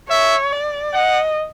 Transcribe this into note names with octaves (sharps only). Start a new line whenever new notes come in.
C#5 E5
D5
D#5 F#5